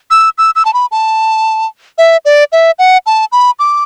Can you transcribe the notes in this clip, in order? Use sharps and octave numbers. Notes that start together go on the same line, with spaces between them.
E6
E6
E6
A5
B5
A5
E5
D5
E5
F#5
A5
B5
D6